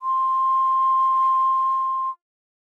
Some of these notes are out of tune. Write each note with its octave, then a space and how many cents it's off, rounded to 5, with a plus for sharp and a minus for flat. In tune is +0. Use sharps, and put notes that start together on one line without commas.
C6 +15